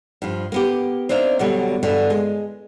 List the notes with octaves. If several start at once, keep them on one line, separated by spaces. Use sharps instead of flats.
G2 F3
A#3 B3 G4
C4 D4 D#4 E5 F5
B2 D3 F#3 G3
G2 B2 D3 E3
G#3